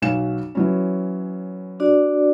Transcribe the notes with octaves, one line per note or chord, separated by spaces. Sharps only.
B1 F#3 E7
E3 F#3 C#4
D4 F#4 D5